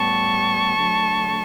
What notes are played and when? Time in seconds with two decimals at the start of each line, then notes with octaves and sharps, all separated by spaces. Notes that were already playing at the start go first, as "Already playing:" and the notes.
Already playing: A2 G3 B3 A5 C#6
0.77 D3 F#3 A3